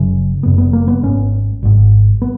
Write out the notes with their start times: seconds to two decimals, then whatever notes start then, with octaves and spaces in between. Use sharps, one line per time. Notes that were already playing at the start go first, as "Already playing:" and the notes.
Already playing: F#1 F#2 C#3
0.43 F#1 F#2 C#3 B3
0.58 B3
0.73 A#3
0.88 B3
1.03 G#1 G#2 C#4
1.63 G#1 G#2
2.22 B3